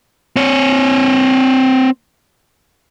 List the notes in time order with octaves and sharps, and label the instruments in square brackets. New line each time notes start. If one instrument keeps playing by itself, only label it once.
[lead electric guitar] C4 C#5